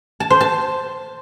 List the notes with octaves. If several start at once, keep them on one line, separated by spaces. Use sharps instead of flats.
A5
C5
A5